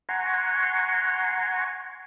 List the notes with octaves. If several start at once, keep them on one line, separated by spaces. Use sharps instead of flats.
F#5 G#5 A#5 C6 C#6